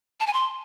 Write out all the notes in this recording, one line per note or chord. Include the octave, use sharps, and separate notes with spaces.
A5
G#5
C6